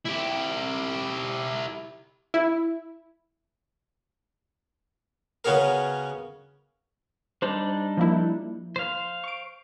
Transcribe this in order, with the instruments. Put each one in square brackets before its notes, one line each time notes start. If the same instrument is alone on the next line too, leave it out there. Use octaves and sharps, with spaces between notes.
[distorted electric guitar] E4 G4
[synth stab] E4
[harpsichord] C#3 B3 C#4 F#4 G#4 A#4
[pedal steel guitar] G3 D4 D#4 [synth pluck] C5
[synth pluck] F3 A#3 E4
[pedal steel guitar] C5 F5
[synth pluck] C#6 D7